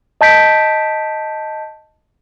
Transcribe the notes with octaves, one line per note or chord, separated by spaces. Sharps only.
D#5 A5 G6 B6 D7